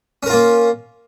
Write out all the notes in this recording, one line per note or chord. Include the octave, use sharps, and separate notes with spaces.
A#3 C#4 F4 A#4